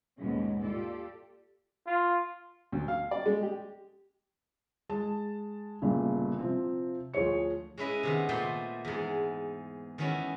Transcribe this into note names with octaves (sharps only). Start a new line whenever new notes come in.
D#2 G#2 B2 G#3 C#4
F4 G4 A4 D5
F4
D2
F5
D5
G#3
G4
G#3 A5
G1 A#2 C#3
C3 F3 C4
D2 F3 G#4 C#5 C#7
G#3 C#4 E4 B4 D#5
C3 D#3 B3
A#2 A3 B3 C5 G5
E2 G#2
D#3 E3 B3 C#4 E4 F#4